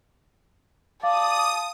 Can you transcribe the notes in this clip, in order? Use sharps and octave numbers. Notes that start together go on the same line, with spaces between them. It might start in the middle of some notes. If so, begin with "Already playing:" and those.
D5 F5 A5 D#6